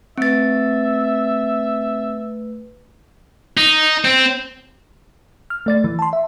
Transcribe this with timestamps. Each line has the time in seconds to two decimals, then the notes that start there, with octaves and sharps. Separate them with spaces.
0.18 A3 C4 B4 E5 A6
3.57 D#4
4.05 C4
5.50 F6
5.66 A3 D5 A6
5.84 E3
5.99 A5 C6
6.13 E5